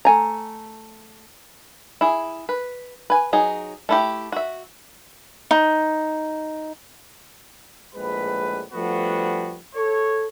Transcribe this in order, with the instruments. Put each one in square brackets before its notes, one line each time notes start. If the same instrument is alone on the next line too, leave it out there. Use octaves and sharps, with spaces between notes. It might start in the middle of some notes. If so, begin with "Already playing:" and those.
[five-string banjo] A3 G#5 A#5
E4 G#4
B4
B4 G#5
F#3 D#4 G#4
A3 E4 G4
F#4 E5
[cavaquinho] D#4
[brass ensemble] A#1 A2 G#3 B4
F3 G3 A3 B3 D4 F#4
A4 C#5